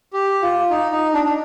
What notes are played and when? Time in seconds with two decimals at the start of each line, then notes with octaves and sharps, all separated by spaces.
0.13 G4
0.42 F4
0.70 D#4
0.91 D#4
1.14 D4
1.25 D4